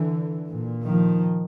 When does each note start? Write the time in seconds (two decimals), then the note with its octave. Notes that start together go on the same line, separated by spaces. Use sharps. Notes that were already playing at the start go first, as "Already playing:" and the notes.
Already playing: D3 E3
0.48 A#2
0.84 D#3 F3